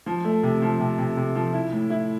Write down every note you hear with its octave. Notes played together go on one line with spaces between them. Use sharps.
F3
A3
C3
F3
C3
C3
C3
F3
E4
A2
E4